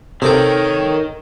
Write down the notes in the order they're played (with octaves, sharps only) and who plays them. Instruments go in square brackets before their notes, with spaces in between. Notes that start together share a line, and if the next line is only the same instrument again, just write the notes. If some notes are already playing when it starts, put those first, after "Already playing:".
[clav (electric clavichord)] C3 [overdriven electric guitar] D#3 [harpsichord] G#4 A4 G5 [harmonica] C#5